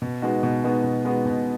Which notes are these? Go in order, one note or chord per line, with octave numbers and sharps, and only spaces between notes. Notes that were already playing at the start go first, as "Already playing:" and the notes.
B2
G#3 B3 D#4 F#4
B2
G#3 B3 D#4 F#4
B2
G#3 B3 D#4 F#4
B2